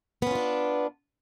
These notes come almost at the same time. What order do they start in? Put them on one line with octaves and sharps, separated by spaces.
B3 C#4 F4 D4